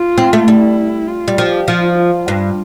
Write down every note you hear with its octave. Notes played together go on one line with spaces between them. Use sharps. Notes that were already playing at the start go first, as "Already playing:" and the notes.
Already playing: F4
C4
A3
G3 E4
F4
G3
F3 G4
F3 F4
F4
G2